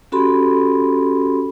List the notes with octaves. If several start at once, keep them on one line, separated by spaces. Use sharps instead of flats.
C#4 F#4 G4 A4 B5 C6